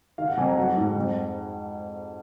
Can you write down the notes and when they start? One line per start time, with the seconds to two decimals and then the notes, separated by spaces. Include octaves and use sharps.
0.18 D#3 F5
0.28 F#5
0.37 F2 G#5
0.48 A#5
0.57 F#3 F#5
0.77 G#2
0.96 F2